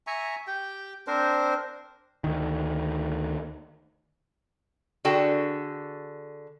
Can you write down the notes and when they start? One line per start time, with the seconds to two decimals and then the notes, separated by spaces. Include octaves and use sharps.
0.07 E5 G#5 A#5 C#6
0.47 G4 G5
1.07 C4 D4 A#4 C5
2.24 D2 D#3
5.05 D3 F#4 G#4 A4 G5